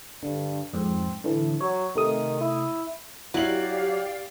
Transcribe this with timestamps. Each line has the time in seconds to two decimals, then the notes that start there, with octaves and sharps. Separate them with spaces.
0.23 G2 D3
0.74 F2 G#2 C4
1.24 A2 D3 E3
1.61 F#3 C#5
1.96 C3 D#3 A3 D#6
2.41 E4
3.34 F#3 E4 G4 D5 F5 F#7